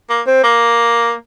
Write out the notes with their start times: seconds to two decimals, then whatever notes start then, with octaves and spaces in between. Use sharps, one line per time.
0.10 A#3
0.27 C4
0.43 A#3